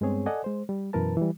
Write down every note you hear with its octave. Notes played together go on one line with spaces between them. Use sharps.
G2 G#3 B3 C4 G#4 C#5
A4 D5 D#5 F#5 G#5
G#3 C5
G3
F#2 B2 E3 A#4 B4 A5
E3 G3